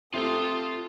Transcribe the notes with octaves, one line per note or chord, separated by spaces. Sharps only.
C3 A3 C4 F4 A4 C6 D#6